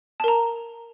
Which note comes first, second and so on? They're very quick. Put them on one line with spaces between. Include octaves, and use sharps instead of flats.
A5 A#4 A#5